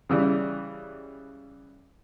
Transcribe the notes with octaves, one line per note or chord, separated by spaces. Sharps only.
C#3 E3 G3